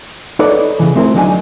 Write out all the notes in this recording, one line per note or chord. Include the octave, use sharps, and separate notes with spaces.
D#4 A4 B4 C#5 D5
C#3 E3
A3 C4 E4 G#4 A#4
D2 F#3 D4 D#4 G#5